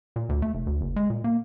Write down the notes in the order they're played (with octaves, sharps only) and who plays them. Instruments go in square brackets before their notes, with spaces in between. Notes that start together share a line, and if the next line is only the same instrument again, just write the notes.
[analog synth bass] A#2
D2
A3
F1
D2
F#1
G#3
A#2
A#3